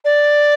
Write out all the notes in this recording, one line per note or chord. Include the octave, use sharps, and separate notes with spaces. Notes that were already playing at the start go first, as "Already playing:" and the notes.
D5